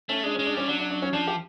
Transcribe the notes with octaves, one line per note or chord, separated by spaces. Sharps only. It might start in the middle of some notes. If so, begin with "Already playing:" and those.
A3 C#4
G#3 D4
C#4
G#3
D4
G3 C#4
F#3 D4
D4
D4
C#4
F3 D4
G4